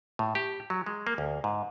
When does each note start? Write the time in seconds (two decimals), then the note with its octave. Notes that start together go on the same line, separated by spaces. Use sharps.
0.19 A2
0.35 G4
0.70 F#3
0.86 G#3
1.07 A#3
1.18 D2
1.44 G#2